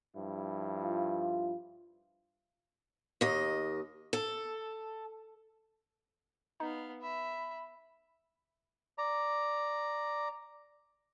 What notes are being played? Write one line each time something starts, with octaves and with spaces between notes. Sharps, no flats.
G2 F3 E4
F4
D#2 D#5
A4
B3 D#4 F5
E5 B5
D5 A#5